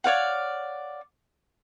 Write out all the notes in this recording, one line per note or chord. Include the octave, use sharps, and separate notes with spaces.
C#5 D5 F5 F#5